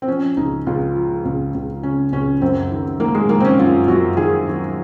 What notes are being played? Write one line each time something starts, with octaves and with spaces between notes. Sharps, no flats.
C4
F3 C#4
C#2 D#4
C#2 F4
F3
C#2
C#2
C#3 C#4
C#2 C#4
F#2 C4
D#3
D#3 A#3
G#3
D#3 A#3
C4
C#4
F#2 F4
F#2 F#4
D#3 G#4
D#3